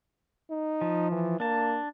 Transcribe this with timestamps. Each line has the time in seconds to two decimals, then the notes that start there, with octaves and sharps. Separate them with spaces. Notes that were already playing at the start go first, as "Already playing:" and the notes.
0.50 D#4
0.81 F3
1.12 E3
1.40 A#3 D4 A5